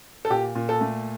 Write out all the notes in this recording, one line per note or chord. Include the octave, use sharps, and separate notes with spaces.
A4
A#2 G4
A#2
A4
A3